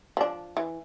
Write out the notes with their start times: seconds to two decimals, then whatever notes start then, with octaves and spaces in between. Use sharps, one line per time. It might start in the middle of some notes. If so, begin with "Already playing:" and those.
0.17 F3 D4
0.57 E3